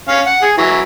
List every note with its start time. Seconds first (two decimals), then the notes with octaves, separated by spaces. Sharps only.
0.09 C#4 F5
0.26 F#5
0.42 G#4
0.58 E3 F#3